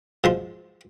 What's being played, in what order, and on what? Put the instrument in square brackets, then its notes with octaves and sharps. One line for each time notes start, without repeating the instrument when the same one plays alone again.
[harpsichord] G#2 F3 C6